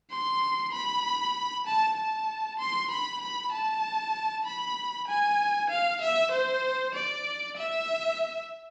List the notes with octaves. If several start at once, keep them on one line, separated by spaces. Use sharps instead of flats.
C6
B5
A5
A5
C6
B5
B5
A5
B5
G#5
F5
E5
C5
D5
E5